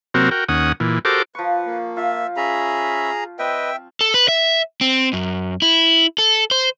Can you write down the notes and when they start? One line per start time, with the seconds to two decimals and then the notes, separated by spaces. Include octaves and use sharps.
0.14 C3 F#3 A#3 C4 F#4 A#4
0.31 F#4 A#4 G5
0.48 D#2 C#4 F#5 D#6
0.80 A#2 E3
1.05 F#4 G4 A4 A#4 C5 D6
1.35 F3 B4 C#6
1.66 A#3
1.97 F4 E5
2.37 C#4 G#4 E5 A#5 B5
3.39 C4 B4 D#5 E5 G5
4.01 A4
4.14 B4
4.28 E5
4.81 C4
5.13 F#2
5.62 E4
6.18 A4
6.51 C5